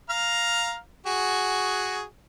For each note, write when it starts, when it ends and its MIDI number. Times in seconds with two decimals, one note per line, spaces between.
0.10 0.76 77
0.10 0.76 82
0.10 0.76 89
1.06 2.04 66
1.06 2.04 68